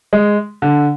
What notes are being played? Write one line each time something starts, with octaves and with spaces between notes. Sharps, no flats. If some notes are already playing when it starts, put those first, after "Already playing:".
G#3
D3